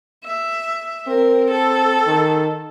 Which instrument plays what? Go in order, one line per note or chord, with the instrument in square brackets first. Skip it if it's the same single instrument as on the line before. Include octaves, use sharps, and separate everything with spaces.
[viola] E5
[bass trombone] C4 [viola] A#4
[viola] A4
[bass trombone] D#3